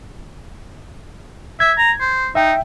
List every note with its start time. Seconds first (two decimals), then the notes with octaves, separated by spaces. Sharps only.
1.60 E5 G#6
1.78 A#5
2.00 C5
2.35 D#4 E5 G5